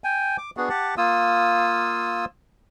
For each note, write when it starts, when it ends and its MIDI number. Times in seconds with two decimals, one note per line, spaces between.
0.04 0.37 79
0.04 0.37 80
0.38 0.51 86
0.57 0.69 59
0.57 0.69 62
0.57 0.69 66
0.57 0.69 68
0.69 0.95 67
0.69 0.95 78
0.69 0.95 81
0.98 2.25 58
0.98 2.25 65
0.98 2.25 87
0.98 2.25 88